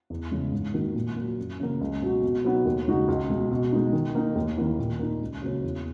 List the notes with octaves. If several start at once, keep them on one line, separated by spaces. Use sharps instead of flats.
E2
C#3 E3 G#3
G#2
D#3 A#3 D#4 F#4
A#2
F#3 A#3
F#2
C#3 E3 A#3
C#2
B2 F#3 C#4 F#4
B2
F#3 B3 D#4
D#2
C#3 G#3 D#4 F#4
C#2
B2 G#3
B2
G#3 D#4
D#3
A#3 D#4
D#2
D#3 A#3 E4
A#2
A#3 D#4
C#2
C#3 F#3 A#3 C#4
E2